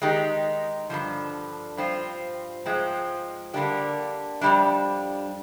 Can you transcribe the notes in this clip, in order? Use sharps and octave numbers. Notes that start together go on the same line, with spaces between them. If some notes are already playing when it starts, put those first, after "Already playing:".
D#3 G#3 D#4 G4
G2 D3 F3
G2 F3 C4 F4
G#2 F3 G#3 C4
D3 G3 A#3 D4 G4
F2 C3 G3 D4